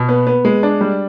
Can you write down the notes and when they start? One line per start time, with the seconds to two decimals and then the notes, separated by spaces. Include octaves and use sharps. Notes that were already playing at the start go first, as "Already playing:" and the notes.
Already playing: B2
0.09 B3
0.27 B3
0.45 G#3
0.63 D4
0.81 G3